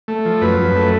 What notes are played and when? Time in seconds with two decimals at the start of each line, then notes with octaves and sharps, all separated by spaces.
0.08 A3
0.25 F3
0.41 F#2 B4
0.59 F#2
0.76 A3